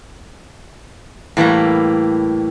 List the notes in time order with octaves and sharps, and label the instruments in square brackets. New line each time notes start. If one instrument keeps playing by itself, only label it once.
[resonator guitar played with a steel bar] A2 E3 G3 A#3